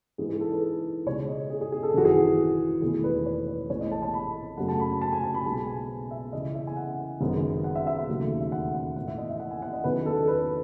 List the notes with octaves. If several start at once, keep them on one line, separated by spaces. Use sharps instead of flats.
G#2 E3 G#3 G#4
G#4
A4
B4
C#2 B2 G#3 C#5
D#5
G#4
G#4
G#4
A4
G#4
G#1 F#2 E3 F#4
G#4
E1 E2 D#3 A3 E4 G#4
B4
C#5
B4
A1 A2 G#3 B3 E4 C#5
D#5
A5
A5
B5
F#2 C#3 F#3 A3 F#5
A5
B5
A5
G#5
A5
B5
B1 B2 G#3 B3 A5
G#5
E5
C#2 C#3 E3 D#5
E5
G#5
F#5
G#1 F#2 C#3 G#3 B3
F#5
E5
E5
E5
E1 D#2 C#3 F#3 A3
E5
F#5
F#5
A2 E3 B3 F#5
E5
D#5
E5
F#5
G#5
F#5
D#5
E2 D#3 F#3 C#4 B4
A4
B4